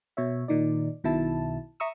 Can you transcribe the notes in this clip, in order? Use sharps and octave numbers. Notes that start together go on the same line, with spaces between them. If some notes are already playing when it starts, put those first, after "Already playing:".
B2 C#5 E5
A#2 D#3 D#4 D5
B1 B2 D#3 E4 A5
E5 A#5 C#6 D#6 E6